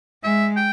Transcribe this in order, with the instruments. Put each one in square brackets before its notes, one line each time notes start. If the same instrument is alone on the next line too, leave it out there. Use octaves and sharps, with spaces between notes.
[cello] G#3 [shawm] E5
[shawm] G5